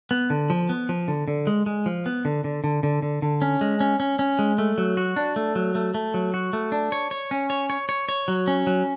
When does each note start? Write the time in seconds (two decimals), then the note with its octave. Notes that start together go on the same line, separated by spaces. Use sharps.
0.11 B3
0.30 D3
0.50 F3
0.69 B3
0.89 F3
1.08 D3
1.28 D3
1.47 G#3
1.66 G#3
1.86 F3
2.06 B3
2.25 D3
2.44 D3
2.64 D3
2.83 D3
3.02 D3
3.22 D3
3.42 C#4
3.61 G#3
3.80 C#4
4.00 C#4
4.19 C#4
4.39 G#3
4.58 A3
4.78 F#3
4.97 F#4
5.16 D4
5.36 A3
5.56 F#3
5.75 A3
5.94 A3
6.14 F#3
6.34 F#4
6.53 A3
6.72 D4
6.92 C#5
7.11 C#5
7.31 C#4
7.50 C#5
7.70 C#5
7.89 C#5
8.09 C#5
8.28 F#3
8.48 C#4
8.67 F#3